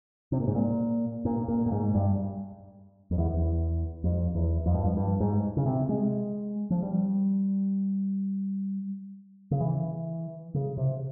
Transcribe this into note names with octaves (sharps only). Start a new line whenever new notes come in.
C3
A#2
G#2
A#2
A#2
A#2
A#2
G#2
G2
F2
E2
E2
F2
E2
F2
G2
F2
G2
G#2
C#3
C3
G#3
F3
G3
C#3
E3
C#3
C3